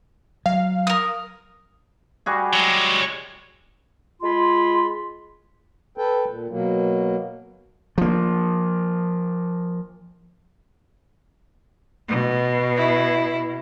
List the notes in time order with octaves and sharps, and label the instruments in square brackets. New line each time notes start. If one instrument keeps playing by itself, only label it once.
[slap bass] F#3 [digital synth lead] F5
[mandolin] A#4 D#6
[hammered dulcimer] G3 F#4 G#4
[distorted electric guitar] F#3 G#3
[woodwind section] G#3 F4 G#4 B5 C6
[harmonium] A4 B4 G5
A#2
B2 F#3 A#3
[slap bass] F3 A#3
[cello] B2
[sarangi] E4